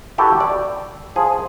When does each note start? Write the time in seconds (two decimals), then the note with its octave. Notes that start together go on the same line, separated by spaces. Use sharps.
0.18 E4 F#4 G4 A4 B4
0.40 D5
1.16 F3 G#4